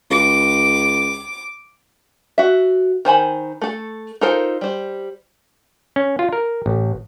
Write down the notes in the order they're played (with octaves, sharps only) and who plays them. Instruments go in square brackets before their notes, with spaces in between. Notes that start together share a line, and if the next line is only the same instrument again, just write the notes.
[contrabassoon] C#2 [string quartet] D6
[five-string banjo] F#4 E5
D#3 C5 G#5 B5
A3 A4
D#4 F4 A4 A#4 C5
G3 C5
[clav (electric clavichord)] C#4
F4
A#4
A1